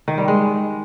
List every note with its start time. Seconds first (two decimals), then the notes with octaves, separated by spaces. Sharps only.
0.08 D#3
0.18 G3
0.28 G#3